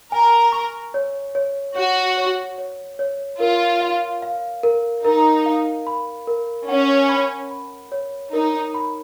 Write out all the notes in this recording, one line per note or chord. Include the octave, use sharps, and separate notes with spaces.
A#4 G#5
C#6
C#5
C#5
F#4 C#5
C#5
C#5
C#5
F4 A#4
F5
F5
A#4
D#4 A#4
F5
B5
A#4
C#4 F#5
B5
B5
C#5
D#4 A#4
B5